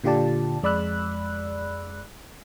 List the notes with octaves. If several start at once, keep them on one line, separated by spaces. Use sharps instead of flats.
A#2 D3 F4 G4 D5 A5
F2 G#3 D5 B5 E6 F#6